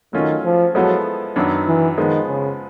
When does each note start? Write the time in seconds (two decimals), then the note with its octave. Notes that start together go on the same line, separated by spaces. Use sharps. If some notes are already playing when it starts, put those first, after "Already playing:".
0.13 D#3 F#3 A3 C#4 F4
0.44 F3
0.75 F3 F#3 G#3 B3 E4 A4
1.36 F#2 D#3 F#3 B3 D4
1.67 E3
1.97 D#3 F3 G#3 B3
2.28 C#3